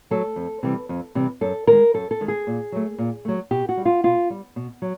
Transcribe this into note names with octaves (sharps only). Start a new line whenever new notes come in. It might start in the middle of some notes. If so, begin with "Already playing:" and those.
F#3 A3 A4
F2
C3 E3 G3
F2
C3 E3 G3
F#2 A4
D#3 G#3 A#4
F#2 A4
A4
D#3 G#3
G#4
A#2
F#3 A3
A#2
F#3 A3
B2 G4
F#4
G3
F4
B2 F4
G3
B2
F#3